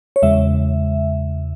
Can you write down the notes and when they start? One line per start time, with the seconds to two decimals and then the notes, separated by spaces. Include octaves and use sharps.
0.16 C#5
0.22 E2 C#3 G#3 E5